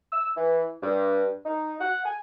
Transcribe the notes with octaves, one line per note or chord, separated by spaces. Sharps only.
E6
E3
G2
D#4
F#5
G#5